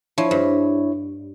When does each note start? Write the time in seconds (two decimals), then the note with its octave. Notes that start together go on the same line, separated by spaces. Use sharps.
0.18 F3 D4 E4 C#5
0.31 G2